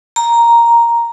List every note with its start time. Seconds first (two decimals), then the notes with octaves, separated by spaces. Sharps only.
0.16 A#5